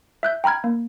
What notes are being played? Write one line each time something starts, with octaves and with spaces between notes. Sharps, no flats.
E5 F#6 G6
G5 A#5 B5 F6 G#6
A#3